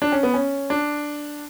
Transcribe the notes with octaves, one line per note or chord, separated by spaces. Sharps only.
D4
C#4
B3
C#4
D4